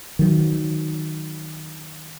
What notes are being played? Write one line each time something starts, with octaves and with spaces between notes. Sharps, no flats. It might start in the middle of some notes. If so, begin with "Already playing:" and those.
D#3 F#3